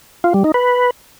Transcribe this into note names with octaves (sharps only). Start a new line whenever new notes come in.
F4
G3
D#4
B4